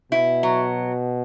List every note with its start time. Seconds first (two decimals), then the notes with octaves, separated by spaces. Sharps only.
0.11 B2 E4
0.43 F#3